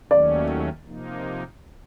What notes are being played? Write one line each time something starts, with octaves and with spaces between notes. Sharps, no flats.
D#2 D#3 F#3 A3 C#4 D5
C3 F3 A#3 D#4